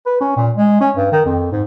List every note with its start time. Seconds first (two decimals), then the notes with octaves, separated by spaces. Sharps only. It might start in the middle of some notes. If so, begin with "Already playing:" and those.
0.06 B4
0.21 C#4
0.37 A#2
0.57 G#3
0.81 C#4
0.97 G2
1.12 D#3
1.26 F2
1.52 G#2